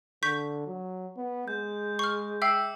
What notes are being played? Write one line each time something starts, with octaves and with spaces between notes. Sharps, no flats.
D3 C#6 G6 B6
F#3
B3
G#3 G6
C#6 F6
E5 G5 D6 E6 C7